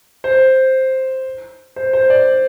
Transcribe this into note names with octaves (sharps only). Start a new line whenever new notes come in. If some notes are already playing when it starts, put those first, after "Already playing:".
C5
C5
C5
D5